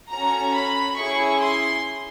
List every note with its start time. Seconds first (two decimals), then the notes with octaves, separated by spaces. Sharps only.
0.12 C#4 F#4 A4 A#5
0.56 B5
0.99 C#4 E4 G#4 C#6
1.42 C6